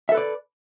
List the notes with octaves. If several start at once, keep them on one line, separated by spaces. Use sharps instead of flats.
A4 B4 D5 E5